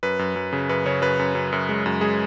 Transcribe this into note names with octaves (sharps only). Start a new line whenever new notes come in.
F#2 B4
F#2
F#2
C#3
F#2 B4
C#3 C#5
F#2 B4
F#2
F#2
F#2
G#3
F#2
G#3 G#4